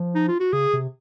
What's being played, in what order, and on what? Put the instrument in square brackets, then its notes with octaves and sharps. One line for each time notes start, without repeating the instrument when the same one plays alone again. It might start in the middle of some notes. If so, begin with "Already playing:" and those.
Already playing: [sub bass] F3
[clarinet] D#4
F4
F#4
[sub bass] C#3 [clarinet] G#4
[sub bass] C3